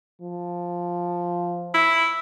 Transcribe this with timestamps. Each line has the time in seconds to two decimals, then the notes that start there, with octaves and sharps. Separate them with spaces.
0.22 F3
1.74 E4